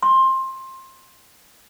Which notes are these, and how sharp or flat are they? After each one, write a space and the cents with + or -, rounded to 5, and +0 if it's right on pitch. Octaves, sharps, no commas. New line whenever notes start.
C6 +20